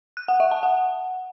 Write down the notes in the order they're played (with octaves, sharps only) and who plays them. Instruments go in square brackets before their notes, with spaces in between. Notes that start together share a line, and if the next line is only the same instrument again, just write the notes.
[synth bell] F#6
F#5
E5
A5
F#5